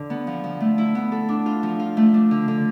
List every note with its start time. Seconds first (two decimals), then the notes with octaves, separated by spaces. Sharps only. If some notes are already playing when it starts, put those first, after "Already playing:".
Already playing: D3 D4 A4
0.10 B3
0.27 F3
0.44 F3
0.60 A3
0.78 E4
0.95 B3
1.12 A4
1.29 D4
1.46 F4
1.63 F3
1.80 F4
1.97 A3
2.14 D4
2.31 D3
2.48 D3